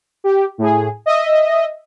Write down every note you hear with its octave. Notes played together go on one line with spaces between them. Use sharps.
G4
A2 G#4
D#5 E5